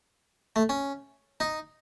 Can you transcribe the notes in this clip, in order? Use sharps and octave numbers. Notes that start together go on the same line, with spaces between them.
A3
C#4
D#4